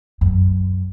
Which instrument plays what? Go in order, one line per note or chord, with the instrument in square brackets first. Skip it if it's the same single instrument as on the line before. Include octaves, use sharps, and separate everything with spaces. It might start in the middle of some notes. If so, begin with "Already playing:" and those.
[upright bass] F#2